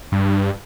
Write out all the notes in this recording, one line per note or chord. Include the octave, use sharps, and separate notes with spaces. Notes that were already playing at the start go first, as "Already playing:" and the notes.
G2